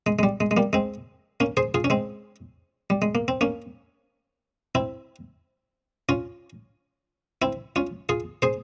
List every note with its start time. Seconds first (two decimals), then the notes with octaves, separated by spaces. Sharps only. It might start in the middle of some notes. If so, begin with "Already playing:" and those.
0.06 G#3
0.19 G#3
0.23 G3
0.40 G#3
0.51 G#3
0.57 G3 A#3
0.73 G#3 C4
1.40 A#3 C#4
1.57 G#4 C5
1.74 F4 G#4
1.84 C#4
1.90 G#3 C4
2.90 G3
3.02 G#3
3.15 A#3
3.28 C4
3.41 A#3 C#4
4.75 C4 E4
6.09 C#4 F4
7.42 C4 E4
7.76 C#4 F4
8.09 F4 G#4
8.42 G#4 C5